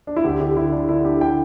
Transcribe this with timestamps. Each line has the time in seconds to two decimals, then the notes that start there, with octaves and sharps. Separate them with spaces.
0.07 D4
0.16 E4
0.24 D2 G4
0.40 D3 G4
0.56 D3 E4
0.72 D3 D4
0.89 D3 E4
1.05 D3 G4
1.21 G5